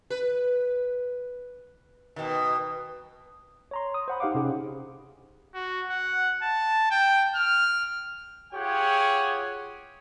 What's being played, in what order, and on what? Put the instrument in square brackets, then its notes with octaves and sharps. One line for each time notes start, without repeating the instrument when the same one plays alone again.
[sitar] B4
B2 D#3
[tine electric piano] C#5 A#5 C6
D#6
C5 F#5 B5
D#4 G4 C5 F5 F#5 D6
C3 C#4 D#4 G4 G#4
[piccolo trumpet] F#4
F#5
A5
G5
F6
[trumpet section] F4 G4 G#4 C#5 F#5 G5